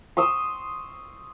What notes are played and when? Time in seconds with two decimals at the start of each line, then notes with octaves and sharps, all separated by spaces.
0.17 C6 C#6 D#6 E6